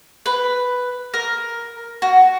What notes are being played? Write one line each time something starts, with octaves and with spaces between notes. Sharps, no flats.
B4
A#4
F#4